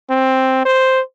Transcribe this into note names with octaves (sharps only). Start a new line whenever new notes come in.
C4
C5